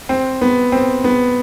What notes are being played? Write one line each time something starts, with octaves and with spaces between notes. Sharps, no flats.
C4
B3
C4
B3